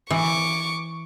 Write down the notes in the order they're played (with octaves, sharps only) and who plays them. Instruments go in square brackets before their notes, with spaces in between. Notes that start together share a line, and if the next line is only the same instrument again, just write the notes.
[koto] E3 [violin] C#6 D6